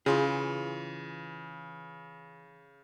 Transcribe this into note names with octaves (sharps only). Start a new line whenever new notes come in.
C#3 E3 F4 G#4